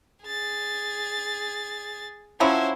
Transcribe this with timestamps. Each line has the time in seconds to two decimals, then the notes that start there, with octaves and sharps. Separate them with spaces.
0.25 G#4 A6
2.40 F3 F#3 C#4 E4 C5